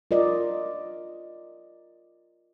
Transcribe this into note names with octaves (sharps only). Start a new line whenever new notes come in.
F4 A#4 D5 D#5